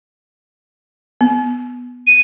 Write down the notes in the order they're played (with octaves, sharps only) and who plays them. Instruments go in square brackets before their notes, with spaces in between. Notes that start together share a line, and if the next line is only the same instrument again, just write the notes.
[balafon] B3
[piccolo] D#7